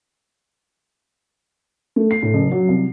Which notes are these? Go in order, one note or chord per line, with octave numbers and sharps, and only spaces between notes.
A3
C7
A2
F#1
F#3
C2